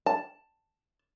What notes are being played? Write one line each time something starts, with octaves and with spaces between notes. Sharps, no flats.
A5